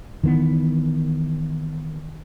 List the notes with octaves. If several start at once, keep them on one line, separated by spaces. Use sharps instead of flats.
D#3 E3 A#3 B3